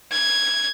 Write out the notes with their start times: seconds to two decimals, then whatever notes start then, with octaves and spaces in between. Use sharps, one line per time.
0.12 G#6